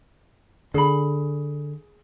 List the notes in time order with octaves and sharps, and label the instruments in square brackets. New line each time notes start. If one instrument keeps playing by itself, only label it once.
[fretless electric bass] D3 [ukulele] G#4 B5